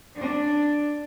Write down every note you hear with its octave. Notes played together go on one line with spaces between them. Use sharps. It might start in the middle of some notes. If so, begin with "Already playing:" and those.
D4